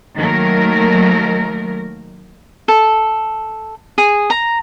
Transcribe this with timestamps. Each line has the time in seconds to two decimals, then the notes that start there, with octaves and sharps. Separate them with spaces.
0.16 D#3 F#3 A3 A#3 A#4
2.68 A4
3.98 G#4
4.30 A#5